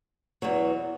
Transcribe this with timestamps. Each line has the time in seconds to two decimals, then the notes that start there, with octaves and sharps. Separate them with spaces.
0.42 E2 B2 F#3